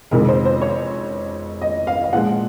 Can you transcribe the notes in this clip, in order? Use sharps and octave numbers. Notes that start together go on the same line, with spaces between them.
F2 C3 D#3 G#3 A#4
C5
C5
C#5
D#5
F5
F5
A#2 F3 G#3 F#5